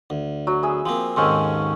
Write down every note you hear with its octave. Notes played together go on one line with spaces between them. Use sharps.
D2
F#3
B3 G#4 E5
F3 A#3 C4
D#2 G#2 D#3 C4 C#4 A4